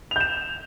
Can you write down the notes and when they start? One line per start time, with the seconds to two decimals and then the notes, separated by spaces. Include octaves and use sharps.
0.11 F7
0.16 G6
0.20 E7